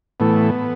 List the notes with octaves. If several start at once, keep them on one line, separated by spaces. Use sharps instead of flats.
A2 E3 A3 B3